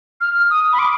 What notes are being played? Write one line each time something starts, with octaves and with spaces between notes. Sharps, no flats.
F6
D#6
B5
D6